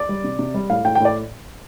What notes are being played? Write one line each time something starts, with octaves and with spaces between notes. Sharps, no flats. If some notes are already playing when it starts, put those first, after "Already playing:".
Already playing: D5
G3
C3
C3
G3
A2 F5
A2 G5
A2 G5
D5